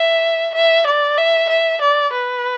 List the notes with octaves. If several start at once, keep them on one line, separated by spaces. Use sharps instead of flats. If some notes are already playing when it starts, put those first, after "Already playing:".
Already playing: E5
E5
D5
E5
E5
D5
B4